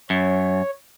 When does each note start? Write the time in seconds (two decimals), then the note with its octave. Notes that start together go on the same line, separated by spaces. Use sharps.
0.10 F#2 C#5